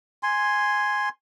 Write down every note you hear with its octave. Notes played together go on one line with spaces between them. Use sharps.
G#5 C6